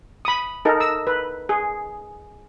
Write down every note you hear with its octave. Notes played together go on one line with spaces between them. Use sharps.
B5 D#6
D#4 A4 A#4
E6
B4
G#4